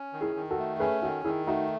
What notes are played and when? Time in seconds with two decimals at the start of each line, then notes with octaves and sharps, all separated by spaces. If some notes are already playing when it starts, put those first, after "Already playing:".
Already playing: C#4
0.13 D#3
0.21 E4 G#4
0.36 D#3
0.50 F#4 A4
0.58 A3
0.80 C#4 G#4 B4
1.02 D#3 F#4 A4
1.24 D#3 E4 G#4
1.46 A3 D#4 F#4